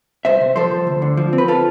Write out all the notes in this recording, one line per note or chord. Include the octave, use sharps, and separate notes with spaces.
C2 C5 E5
C3
F3 A4 C5
C2
D2
D3
F3
C4
B4
F4 A4